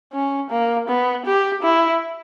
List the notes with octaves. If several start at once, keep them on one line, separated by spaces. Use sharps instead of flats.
C#4
A#3
B3
G4
E4